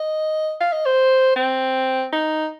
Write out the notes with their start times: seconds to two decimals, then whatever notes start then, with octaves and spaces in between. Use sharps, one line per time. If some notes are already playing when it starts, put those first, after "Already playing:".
Already playing: D#5
0.61 F5
0.73 D#5
0.86 C5
1.36 C4
2.13 D#4